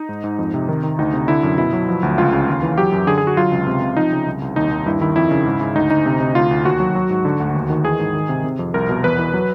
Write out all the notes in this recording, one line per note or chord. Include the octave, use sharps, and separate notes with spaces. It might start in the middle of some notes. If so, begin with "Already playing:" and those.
Already playing: D#4
G#2
G#2
F2
C3
D#3
D#3
D2 D#4
C3
D3 E4
F#2
B2 E4
F#3
F3
D2
C#2 F4
C#3
D#2
E3
F#3 G4
F#2
D3 G#4
G#4
D3
F#4
F#3 F4
C#2
C3
C3
F3 D#4
C#3
C2
C2
D#2 D#4
D#2
G2 E4
D#3 E4
F2 E4
C#3
G#2
G#2
D2 D#4
D2 D#4
C3
C3
D2 F4
D2
D#2 F#4
F#3
F#3
G#2
D3
D2
D#2
D#3
E3 G#4
G#2
D#3
C3
C3
F2
C2 A#4
B2
E2 B4
E3
F#3